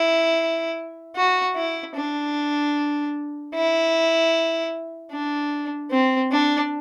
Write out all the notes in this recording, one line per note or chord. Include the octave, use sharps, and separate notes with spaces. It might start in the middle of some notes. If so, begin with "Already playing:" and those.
Already playing: E4
F#4
E4
D4
E4
D4
C4
D4